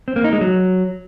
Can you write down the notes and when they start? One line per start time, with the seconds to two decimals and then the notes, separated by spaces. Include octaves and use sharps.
0.08 C4
0.16 A#3
0.24 D#4
0.33 G#3
0.41 F#3